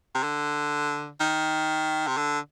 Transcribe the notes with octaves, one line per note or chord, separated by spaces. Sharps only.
C3
D3
D#3
C3
D3